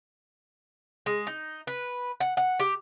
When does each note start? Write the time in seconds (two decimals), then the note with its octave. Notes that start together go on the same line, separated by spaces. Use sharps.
1.06 G#3
1.27 D#4
1.67 B4
2.20 F#5
2.37 F#5
2.59 G4